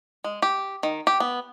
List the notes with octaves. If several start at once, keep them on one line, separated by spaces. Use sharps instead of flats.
G#3
G4
D#3
G4
B3